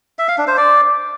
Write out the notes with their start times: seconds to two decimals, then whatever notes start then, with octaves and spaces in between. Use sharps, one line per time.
0.19 E5
0.28 F5
0.38 D4
0.47 C5
0.57 D5